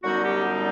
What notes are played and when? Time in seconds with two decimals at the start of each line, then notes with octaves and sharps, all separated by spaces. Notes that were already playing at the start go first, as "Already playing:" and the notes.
0.02 F#2 D3 G3 B3 D#4 F#4
0.23 G4